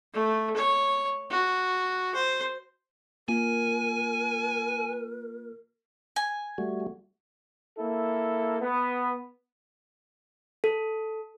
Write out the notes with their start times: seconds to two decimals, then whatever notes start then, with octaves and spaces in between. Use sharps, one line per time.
0.13 A3
0.56 C#5
1.30 F#4
2.14 C5
3.29 A#3 F4 A#4 G#5
6.16 G#5
6.58 G3 A3 F#4
7.77 A#3 E4 A4
8.61 B3
10.64 A4